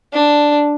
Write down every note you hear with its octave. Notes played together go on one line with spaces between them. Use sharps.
D4